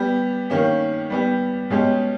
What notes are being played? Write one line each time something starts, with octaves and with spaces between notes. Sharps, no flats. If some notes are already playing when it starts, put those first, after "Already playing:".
Already playing: G3 B3 G4
D#3 A#3 C#4 G4
G3 B3 G4
B2 G#3 C#4 G4